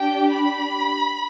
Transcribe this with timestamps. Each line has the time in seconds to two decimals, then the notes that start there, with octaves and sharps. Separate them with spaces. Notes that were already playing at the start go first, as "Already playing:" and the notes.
Already playing: D4 G4 G5
0.34 B5